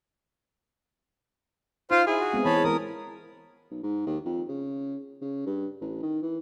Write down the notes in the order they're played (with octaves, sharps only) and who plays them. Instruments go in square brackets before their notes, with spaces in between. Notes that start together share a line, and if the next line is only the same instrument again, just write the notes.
[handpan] D#4 [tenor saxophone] F4 [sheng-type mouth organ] C5 F5 C6
[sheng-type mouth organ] E4 [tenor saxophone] G#4
[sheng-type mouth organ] F#4
[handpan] G#3 B3 C4
[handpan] E3 [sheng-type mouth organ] C#5 A5 B5
[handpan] E3 G#3 [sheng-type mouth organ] A#4 D#6
[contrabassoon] B1
G#2
D#2
F2
C#3
C#3
G2
A1
D#3
E3